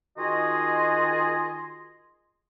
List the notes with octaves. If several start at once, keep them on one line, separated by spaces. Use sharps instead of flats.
D#3 F4 F#4 G#4 D#5 C6